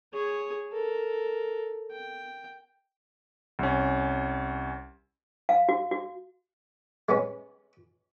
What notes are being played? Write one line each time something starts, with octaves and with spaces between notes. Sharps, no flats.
G#4 C#5
A4 A#4
G5
C2 C#4
F5
F#4
F#4
G#3 B3 C#4